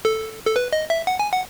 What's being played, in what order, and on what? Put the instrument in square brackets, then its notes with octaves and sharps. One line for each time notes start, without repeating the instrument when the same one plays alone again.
[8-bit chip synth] A4
A4
B4
D#5
E5
F#5
G#5
F#5